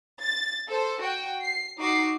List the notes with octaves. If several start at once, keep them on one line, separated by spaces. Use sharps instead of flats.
A6
A4 C5
F#4 G5
C7
D#4 F#4 D6 C7